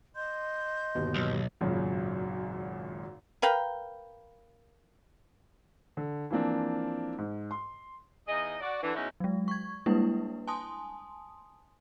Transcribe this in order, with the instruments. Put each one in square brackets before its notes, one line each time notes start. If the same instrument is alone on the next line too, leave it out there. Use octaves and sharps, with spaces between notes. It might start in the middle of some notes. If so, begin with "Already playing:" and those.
[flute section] D#5 C6 G6
[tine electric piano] G1 D#2 B2
[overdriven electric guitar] B1
[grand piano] G#1 F#2 A#2 C#3 F#3
[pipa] A#4 B4 F5 G5
[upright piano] D3
E3 F3 A#3 C4 D4
G#2
C6
[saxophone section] E2 D#4 G#4 D#5
F#4 D5
D3 E3
B2 F#3 G#3 C#4 D#4 E4
[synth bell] F#3 G#3
C#6 G#6
G3 G#3 A#3 D4 E4 B4
G#5 A5 C6 D#6